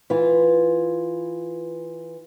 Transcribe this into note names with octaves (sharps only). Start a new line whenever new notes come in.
E3 F4